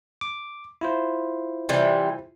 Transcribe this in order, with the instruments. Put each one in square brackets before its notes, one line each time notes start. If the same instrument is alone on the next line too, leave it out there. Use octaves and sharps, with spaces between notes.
[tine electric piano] D6
E4 F4 C5
[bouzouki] C3 E3 G3